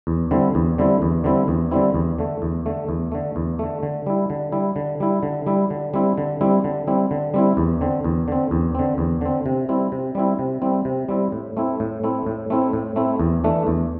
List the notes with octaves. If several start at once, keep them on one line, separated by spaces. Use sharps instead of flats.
E2
D3 G3 C4 E4
E2
D3 G3 C4 E4
E2
D3 G3 C4 E4
E2
D3 G3 C4 E4
E2
D3 A3
E2
D3 A3
E2
D3 A3
E2
D3 A3
D3
G3 E4
D3
G3 E4
D3
G3 E4
D3
G3 E4
D3
G3 C4 E4
D3
G3 C4 E4
D3
G3 C4 E4
D3
G3 C4 E4
E2
D3 C4
E2
D3 C4
E2
D3 C4
E2
D3 C4
C3
G3 C4 E4
C3
G3 C4 E4
C3
G3 C4 E4
C3
G3 C4 E4
A2
A3 C4 E4
A2
A3 C4 E4
A2
A3 C4 E4
A2
A3 C4 E4
E2
E3 A3 D4
E2